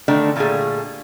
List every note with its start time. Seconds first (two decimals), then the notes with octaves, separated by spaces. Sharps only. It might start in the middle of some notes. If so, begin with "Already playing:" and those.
0.08 D3 D#3 A3 D4
0.36 A#2 D3 F#3 G3 A3 G#4